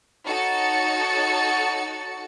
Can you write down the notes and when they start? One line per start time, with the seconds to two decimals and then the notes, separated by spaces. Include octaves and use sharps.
0.24 D#4 F#4 A4 C#5 A6 C#7